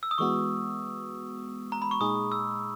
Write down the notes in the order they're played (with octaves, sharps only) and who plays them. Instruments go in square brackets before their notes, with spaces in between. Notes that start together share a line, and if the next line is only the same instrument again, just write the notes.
[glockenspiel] E6
D#6
[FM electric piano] E3 G#3 B3 F#4 [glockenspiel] C#6
[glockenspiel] A#5
B5
C#6
[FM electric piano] A#2 G#3 D#4 G#4 [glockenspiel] D#6
[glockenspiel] E6